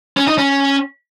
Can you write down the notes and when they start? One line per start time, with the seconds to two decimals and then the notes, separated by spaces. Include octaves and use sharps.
0.17 C#4
0.27 D#4
0.38 C#4